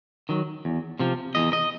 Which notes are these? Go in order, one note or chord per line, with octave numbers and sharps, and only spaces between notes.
D#3 F#3
E2
C3 F3
E2 D#5
D#5